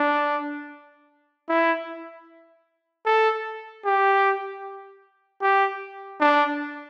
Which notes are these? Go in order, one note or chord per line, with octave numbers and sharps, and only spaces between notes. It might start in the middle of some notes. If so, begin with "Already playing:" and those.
Already playing: D4
E4
A4
G4
G4
D4